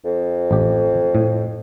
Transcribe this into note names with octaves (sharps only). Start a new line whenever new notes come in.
F2
A1 G4
A2